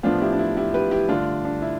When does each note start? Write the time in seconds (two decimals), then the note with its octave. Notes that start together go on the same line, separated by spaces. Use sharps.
0.03 A2 F3 B3 D4 F4
0.21 E4 G4
0.33 D4
0.39 E4
0.57 E4 G4
0.74 G4 B4
0.91 E4 G4
1.09 G2 D3 A3 D4 F4
1.45 D4
1.62 E4